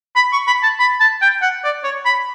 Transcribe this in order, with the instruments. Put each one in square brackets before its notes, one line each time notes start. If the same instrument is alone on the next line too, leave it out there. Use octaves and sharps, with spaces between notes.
[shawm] B5
C#6
B5
A5
B5
A5
G5
F#5
D5
C#5
B5